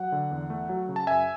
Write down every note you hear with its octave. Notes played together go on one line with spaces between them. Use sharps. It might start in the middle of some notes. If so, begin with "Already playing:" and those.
Already playing: F#3 F#5
D3
E2
A3
F#3
C#3
A5
F#2 E5 G#5